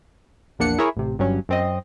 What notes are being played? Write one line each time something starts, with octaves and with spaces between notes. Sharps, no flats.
A#1 E2 A#3 D4 F#5 C#7
E4 G#4 A#4 C#5
A1 C3
G1 G2 F#3 C#4
F#2 C4 D#5